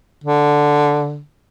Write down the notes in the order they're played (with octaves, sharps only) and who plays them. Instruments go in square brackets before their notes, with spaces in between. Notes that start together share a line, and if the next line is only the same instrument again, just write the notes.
[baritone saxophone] D3